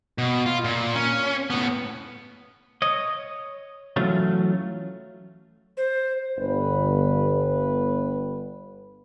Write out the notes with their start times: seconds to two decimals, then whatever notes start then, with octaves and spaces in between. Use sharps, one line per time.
0.18 B2
0.46 F4
0.64 A#2
0.95 C#4
1.50 A2 B3
2.82 C#5 D#5
3.96 E3 F#3 A3 C#4 F4
5.77 C5
6.37 G1 B4